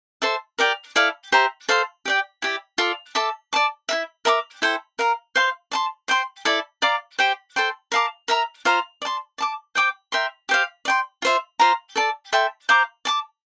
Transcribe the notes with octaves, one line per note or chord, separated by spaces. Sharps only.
A4 C5 E5 A5
G4 A#4 D5 G5
E4 A4 D5 F5
G4 C5 E5 A#5
A4 C5 F5 C6
G4 D5 G5
E4 G4 D5
F4 A4 D5
A4 E5 A5 D6
D5 A5 D6
E4 A#4 E5
A#4 E5 A#5 D6
E4 A4 C5 G5
A#4 F5 A#5
C5 F5 C6
D5 A5 C6
C5 G5 C6
E4 A4 D5
D5 F5 A#5 D6
G4 C5 G5
A4 C5 G5 C6
A#4 F5 A5 D6
A#4 E5 A#5
F4 C5 F5 A#5
D5
A5 C6
D5 A5 D6
C5 G5 D6
A#4 E5 G5 C6
G4 C5 F5
D5
G5 C6
F4 C5 E5
F4 C5 F5 A#5
A4 D5 A5
A4 E5 G5 C6
C5 F5 A#5 D6
D5 A5 D6